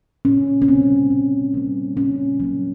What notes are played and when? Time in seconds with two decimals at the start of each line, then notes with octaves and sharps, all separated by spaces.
0.25 A#2 C#4
0.62 C#4
0.68 G3 A#3 C4
1.11 A#2
1.54 G3 A#3
1.97 A#2 C#4
2.40 F#3 A#3